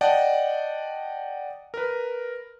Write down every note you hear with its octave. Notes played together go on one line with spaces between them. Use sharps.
D5 D#5 F#5 G5 A5
A#4 B4